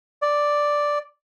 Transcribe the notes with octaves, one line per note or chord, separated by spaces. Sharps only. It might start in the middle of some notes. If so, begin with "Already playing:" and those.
D5